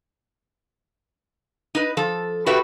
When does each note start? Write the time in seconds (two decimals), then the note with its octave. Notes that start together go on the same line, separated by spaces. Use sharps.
1.75 D#4 B4
1.97 F3 A4
2.46 F#4 G4 A4 B4 E5